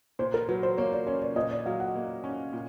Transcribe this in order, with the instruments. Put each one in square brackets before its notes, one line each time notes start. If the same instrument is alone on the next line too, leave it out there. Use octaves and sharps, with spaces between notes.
[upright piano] A#2 [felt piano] C5
[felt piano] A#4
[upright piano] F#3 [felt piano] B4
[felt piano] C5
[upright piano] A#3 [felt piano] C#5
[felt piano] D5
[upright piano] C#4 [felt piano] C#5
[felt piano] D5
[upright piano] A#2 [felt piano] D#5
[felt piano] D5
[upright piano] F#3 [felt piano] F5
[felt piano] F#5
[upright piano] A#3
C#4
A#2